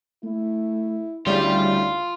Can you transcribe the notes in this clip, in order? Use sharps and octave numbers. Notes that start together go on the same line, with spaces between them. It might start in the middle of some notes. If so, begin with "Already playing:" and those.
A3 E4
D2 C#3 G3 E4 F4